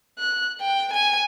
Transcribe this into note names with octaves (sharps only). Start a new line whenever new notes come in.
F#6
G5
G#5